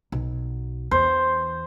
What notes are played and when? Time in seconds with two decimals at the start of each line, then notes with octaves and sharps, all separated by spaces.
0.12 B1
0.91 E2 C5